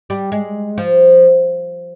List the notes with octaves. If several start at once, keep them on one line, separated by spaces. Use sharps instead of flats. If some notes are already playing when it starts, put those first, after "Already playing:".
G3
G#3
F3